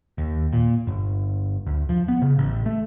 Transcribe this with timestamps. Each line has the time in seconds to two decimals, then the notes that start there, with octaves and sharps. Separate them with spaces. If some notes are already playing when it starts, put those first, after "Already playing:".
0.18 D#2
0.53 A#2
0.87 G1
1.67 D2
1.89 F3
2.08 B3
2.22 C#3
2.38 A1
2.66 A3